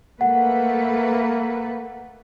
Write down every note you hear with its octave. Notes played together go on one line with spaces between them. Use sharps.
A3 A#3 B4 F#5